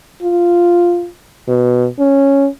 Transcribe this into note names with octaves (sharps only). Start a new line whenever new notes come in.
F4
B2
C#4